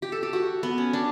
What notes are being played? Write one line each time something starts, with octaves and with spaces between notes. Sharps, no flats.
G4
A4
G4
F#4
B3
C#4
D4